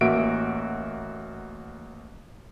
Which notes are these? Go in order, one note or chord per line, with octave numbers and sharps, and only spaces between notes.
A1 A#3 F#4 E5 D7